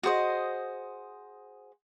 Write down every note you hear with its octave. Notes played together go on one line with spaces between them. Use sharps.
F#4 G#4 C5 D#5